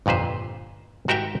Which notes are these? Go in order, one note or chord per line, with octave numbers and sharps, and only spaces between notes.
G1 F2 A#2 B4 C5
G#2 F#4 G4 A#4 E5 G5